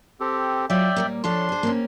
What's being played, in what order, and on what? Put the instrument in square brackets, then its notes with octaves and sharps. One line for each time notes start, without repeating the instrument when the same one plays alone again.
[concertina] C4 G4 A4
[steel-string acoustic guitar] F#3 F4 [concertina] D5 E5 G5
[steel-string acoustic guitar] A#2 G3 A#3
[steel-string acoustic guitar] F3 A4 C#5 [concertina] D4 C6
[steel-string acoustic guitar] G#4 C5
A#3 C4 C#4